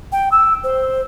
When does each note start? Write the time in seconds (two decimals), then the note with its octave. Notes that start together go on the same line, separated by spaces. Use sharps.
0.12 G5
0.32 E6
0.64 C5